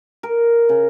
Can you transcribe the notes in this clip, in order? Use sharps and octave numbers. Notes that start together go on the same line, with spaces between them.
A#4
C#3